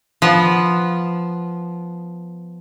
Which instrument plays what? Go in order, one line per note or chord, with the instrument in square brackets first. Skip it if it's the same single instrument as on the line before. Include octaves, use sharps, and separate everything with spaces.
[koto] F3 B3